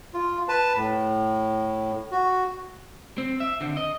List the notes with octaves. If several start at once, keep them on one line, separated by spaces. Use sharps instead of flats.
F4
B4 A5
A2
F#4
C4
E5
D3 C4
D#5